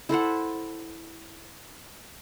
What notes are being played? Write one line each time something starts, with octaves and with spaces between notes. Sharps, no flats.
E4 A4 C5 F#5